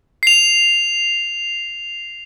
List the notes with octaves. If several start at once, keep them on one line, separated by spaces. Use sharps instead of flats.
C7 F7